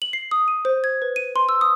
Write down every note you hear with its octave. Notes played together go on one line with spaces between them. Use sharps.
F#7
C7
D#6
D#7
C5
G#6
B4
D#7
C6
E6
D#6